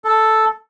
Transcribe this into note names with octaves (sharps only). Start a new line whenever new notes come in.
A4